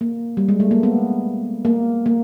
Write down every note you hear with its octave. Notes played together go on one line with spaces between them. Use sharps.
A#3
G3
G#3
A3
A#3
B3
A#3
A#3